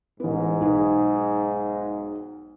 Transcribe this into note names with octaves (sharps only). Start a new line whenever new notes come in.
A1 G#2 B3
B1 G#4